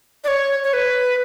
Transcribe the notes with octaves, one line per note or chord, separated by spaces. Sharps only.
D5
C#5
C#5
B4